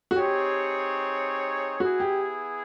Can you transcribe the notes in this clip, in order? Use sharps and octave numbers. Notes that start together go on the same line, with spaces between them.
F#4
C4 D#4 G4 G#4 C#5
B3 E4 F#4 G#4
G4